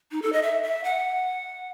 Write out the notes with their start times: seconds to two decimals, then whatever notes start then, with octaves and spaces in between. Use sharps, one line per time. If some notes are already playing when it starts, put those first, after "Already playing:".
0.12 D#4
0.22 A4
0.33 D#5
0.42 E5
0.63 E5
0.84 F#5